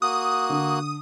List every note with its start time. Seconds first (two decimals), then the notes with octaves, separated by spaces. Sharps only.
0.02 A#3 F#4 D#6 F#6
0.50 D3